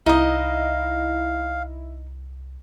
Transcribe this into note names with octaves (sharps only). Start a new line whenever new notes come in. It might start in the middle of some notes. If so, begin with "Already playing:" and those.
C2 D#4 E4 D#5 F5